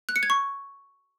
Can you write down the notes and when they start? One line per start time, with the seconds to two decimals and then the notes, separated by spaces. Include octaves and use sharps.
0.09 F#6
0.16 C#7
0.23 G#6
0.30 C#6